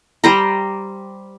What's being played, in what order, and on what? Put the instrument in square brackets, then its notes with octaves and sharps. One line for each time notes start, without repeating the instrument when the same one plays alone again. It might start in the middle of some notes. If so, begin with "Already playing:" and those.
[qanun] G3 C5 A#5